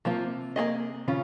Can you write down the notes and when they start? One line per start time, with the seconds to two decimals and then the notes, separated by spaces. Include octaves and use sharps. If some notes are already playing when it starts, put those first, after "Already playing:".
0.05 C3 F3 A#3 F4
0.56 A#3 C#4 G#4 D#5
1.08 C#3 C#4 F4